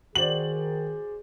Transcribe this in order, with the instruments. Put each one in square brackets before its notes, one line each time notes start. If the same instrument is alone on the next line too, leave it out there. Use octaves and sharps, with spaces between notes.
[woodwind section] D#3 [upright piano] F#4 C5 D5 [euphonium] G#4 [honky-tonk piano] F#7